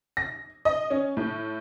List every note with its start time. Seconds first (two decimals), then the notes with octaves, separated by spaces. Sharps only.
0.17 A#6
0.65 D#5
0.90 C#4
1.17 A2